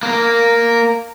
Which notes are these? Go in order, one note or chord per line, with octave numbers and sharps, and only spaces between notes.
A#3 A#4